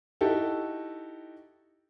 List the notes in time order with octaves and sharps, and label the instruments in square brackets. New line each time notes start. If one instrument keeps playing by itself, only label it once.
[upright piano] D#4 E4 F#4 G4 A4